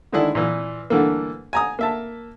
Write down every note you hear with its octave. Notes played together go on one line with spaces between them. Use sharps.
D3 D#3 G#3 D4 E4 G#4
A#2 E3
G2 D3 E3 A3 A#3
G#5 A#5 D#6
A#3 E5 A5